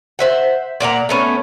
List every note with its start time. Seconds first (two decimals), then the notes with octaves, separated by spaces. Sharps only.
0.19 C5 E5 F#5
0.80 A#2 D5 F#5 A#5
1.09 A3 B3 C#4